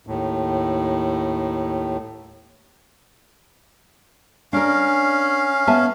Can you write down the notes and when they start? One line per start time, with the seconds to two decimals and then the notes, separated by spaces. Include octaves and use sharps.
0.07 D#2 A2
4.53 C#4 D4 A#4 F5
5.67 B3 E5 A5